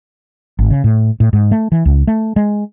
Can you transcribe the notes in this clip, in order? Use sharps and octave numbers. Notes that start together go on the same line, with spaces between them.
G#1
C#3
A2
A2
G#2
A3
E3
C#2
A3
G#3